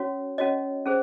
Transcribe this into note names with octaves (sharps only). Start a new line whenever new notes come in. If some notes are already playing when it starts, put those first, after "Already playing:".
Already playing: C#4 F#4 C#5
C#4 F#4 C#5 D#5
C#4 G#4 C5